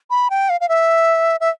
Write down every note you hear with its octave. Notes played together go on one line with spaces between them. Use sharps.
B5
G5
F5
F5
E5
E5